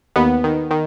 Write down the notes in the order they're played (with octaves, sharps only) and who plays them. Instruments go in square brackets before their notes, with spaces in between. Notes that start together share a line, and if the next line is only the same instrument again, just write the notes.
[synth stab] D#2 B3
D#3
D#3